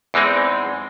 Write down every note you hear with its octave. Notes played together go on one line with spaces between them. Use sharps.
E2 E3 G#3 C4 D#4